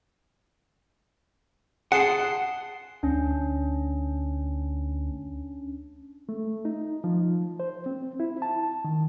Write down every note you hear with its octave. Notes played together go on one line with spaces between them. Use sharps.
G#4 F#5 A5 C6
D2 C#4 D4
A3
D#4
F3
C5
C4
E4
A5
D#3